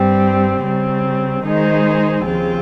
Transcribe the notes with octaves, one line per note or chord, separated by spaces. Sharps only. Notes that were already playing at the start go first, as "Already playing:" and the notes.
Already playing: G2 G3 C4 G4
C#3 G3 C4
D#3 G#3 D#4 G#4 C5
D#2 C#3 F3 C4 F4